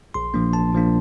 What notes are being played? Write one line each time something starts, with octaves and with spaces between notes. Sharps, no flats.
A#1 C6
A#2 F3 A#3 D4
A#1 A5
A#2 F3 A#3 D4